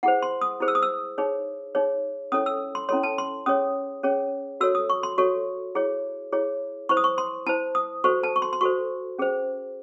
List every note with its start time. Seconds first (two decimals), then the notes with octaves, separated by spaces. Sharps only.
0.03 E4 G#4 C5 F#5
0.22 C6
0.41 D#6
0.61 E4 G#4 C5
0.68 E6
0.75 D#6
0.82 E6
1.18 D#4 G#4 C#5
1.75 D#4 G#4 C#5
2.32 C#4 E4 A4 C#5 D#6
2.46 E6
2.75 C6
2.89 C#4 E4 A4 C#5 C6
3.03 A5
3.18 C6
3.46 C#4 G#4 C#5 D#6
4.03 C#4 G#4 C#5
4.61 F#4 A4 C#5 E6
4.75 D#6
4.90 C#6
5.03 C6
5.18 F#4 A4 C#5 C#6
5.75 E4 G#4 C#5
6.32 E4 G#4 C#5
6.89 E4 C5 C#6
6.97 D#6
7.04 C#6
7.18 C6
7.46 E4 C5 A5
7.75 D#6
8.04 F#4 A4 C5 C#6
8.23 A5
8.36 C#6
8.42 C6
8.53 C6
8.61 F#4 A4 C5 C#6
9.19 C#4 G#4 C5